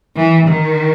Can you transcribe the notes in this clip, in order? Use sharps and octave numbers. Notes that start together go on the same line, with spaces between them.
E3
D#3